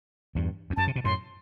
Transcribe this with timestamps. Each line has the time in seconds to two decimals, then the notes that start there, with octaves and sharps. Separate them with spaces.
0.35 E2 G2
0.70 E2
0.77 F#2 A5
0.87 C3
0.96 B2
1.04 F#2 A2 C6